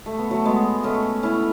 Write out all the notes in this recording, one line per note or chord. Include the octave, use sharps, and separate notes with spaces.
A3
B3
F#3 A3
G#3 B3
A3 C#4
C#4 E4